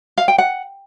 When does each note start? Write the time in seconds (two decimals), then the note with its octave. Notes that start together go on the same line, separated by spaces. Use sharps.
0.18 F5
0.28 G5
0.38 F#5